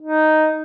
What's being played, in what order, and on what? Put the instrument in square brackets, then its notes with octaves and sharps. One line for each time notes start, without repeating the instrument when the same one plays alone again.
[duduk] D#4